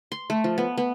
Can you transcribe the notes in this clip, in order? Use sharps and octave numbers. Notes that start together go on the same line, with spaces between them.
C6
A3
F3
B3
B3